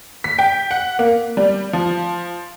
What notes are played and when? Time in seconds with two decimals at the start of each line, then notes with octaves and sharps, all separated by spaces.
0.24 B6
0.39 G5
0.71 F#5
0.99 A#3
1.37 G3
1.73 F3